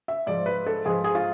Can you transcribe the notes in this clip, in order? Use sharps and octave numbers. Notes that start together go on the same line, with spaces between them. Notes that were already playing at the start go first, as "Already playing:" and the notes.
E5
G#2 F3 D5
B4
A4
G#2 F3 G#4
G#4
F4